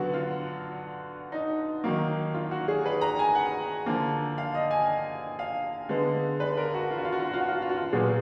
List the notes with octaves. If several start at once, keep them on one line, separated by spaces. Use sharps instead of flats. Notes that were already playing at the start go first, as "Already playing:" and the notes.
Already playing: D3 F#3 B3 F#4
F4
D#4
D#3 F#3 A#3
F4
F#4
G#4
B4
A#5
G#5
F#5
D3 F3 A#3
F5
D#5
G#5
F5
D3 G#3 B3
B4
A#4
F#4
F4
F#4
F4
F#4
F4
F#4
F4
F#4
F4
F#4
F4
F#4
F4
A#2 F#3 B3 G#4